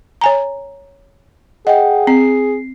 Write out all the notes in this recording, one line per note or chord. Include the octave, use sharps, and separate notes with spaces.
C#5 G#5 A#5
G#4 D#5 F#5 G5
C4 C7